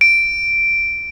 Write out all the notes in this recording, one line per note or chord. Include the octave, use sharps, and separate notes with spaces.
D7